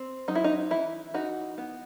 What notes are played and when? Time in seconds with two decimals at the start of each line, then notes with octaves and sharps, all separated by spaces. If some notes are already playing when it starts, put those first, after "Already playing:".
Already playing: C4
0.28 F#3 D#4
0.35 E4
0.44 D#4
0.71 E3 E4
1.14 E3 D#4 F#4
1.58 B3